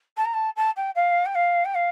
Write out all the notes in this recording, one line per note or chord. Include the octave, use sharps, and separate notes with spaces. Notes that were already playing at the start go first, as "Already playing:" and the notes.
A5
A#5
A5
A5
G5
F5
G5
F5
G5
F5